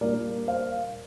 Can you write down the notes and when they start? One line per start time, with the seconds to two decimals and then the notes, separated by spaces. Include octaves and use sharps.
0.01 A#2 G3 A#3 D4 F4 A#4 D5
0.47 C5 F5